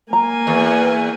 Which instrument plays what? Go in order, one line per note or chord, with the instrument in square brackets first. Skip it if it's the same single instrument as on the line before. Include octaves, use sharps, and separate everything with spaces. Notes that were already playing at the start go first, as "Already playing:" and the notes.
[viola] A#3 G#5 [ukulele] A#5
[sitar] E2